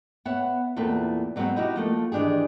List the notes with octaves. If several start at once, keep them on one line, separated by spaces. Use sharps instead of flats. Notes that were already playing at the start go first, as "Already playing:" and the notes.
B3 C#5 E5 F#5
E2 A#2 A3 C4 B4
D3 F#3 G#3 B3 C4
D#4 E4 F#4 G4
F3 A3 A#3
D#3 E3 D4 G4 G#4